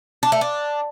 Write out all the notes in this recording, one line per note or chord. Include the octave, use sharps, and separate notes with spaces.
D4
A3
D4